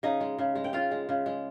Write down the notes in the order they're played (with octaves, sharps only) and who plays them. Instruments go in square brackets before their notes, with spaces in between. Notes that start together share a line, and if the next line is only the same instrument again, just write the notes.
[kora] C#3 D#4 D#5
G#3
C#3
G#3
G5
C#3 F4 F5
G#3
C#3
G#3